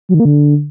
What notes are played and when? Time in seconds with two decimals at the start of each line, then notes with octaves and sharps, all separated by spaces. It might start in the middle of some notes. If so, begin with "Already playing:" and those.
0.09 F#3
0.14 D#3
0.20 A#3
0.25 D3